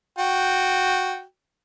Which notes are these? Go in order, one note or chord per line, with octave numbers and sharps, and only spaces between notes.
F#4 G5